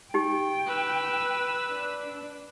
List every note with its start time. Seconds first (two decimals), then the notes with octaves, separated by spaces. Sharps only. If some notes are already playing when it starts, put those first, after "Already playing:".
0.14 D#4 G4 G5
0.67 B4 E6
1.71 D4